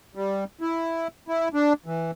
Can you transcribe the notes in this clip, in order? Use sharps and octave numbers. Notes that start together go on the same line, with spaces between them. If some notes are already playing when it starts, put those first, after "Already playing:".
G3
E4
E4
D4
E3